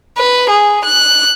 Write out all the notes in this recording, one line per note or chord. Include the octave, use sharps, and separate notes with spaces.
B4
G#4
F#6